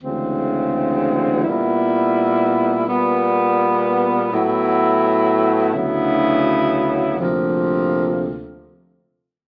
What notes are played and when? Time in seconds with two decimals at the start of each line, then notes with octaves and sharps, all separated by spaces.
0.01 D2 C#3 E3 G#3 C4
1.44 A#2 G3 B3 E4
2.87 A#2 G3 B3
4.30 A2 F#3 B3 E4
5.73 D2 C#3 F#3 B3 E4
7.17 D2 C3 F3 A#3